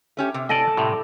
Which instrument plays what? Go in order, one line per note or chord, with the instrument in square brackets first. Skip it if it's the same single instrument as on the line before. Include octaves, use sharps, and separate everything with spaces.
[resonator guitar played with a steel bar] A3 C#4 G4
C3
[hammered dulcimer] A4 A5 [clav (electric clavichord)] D5 D#5
[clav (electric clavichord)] A2 C3 [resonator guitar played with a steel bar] G3